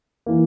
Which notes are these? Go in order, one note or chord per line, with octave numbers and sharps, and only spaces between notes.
E3 A#3